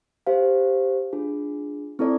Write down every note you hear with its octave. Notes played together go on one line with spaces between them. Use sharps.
G4 C5 F5
D4 F4 G#4
C4 E4 A4 D5